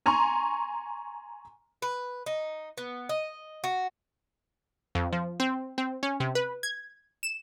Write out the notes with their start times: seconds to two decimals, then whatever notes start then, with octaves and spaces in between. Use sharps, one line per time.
0.06 G#5 A#5 C6 C#6
1.82 B4
2.26 D#4
2.78 B3
3.09 D#5
3.64 F#4
4.95 F2
5.13 F3
5.40 C4
5.78 C4
6.03 C#4
6.20 C3
6.35 B4
6.63 G#6
7.23 E7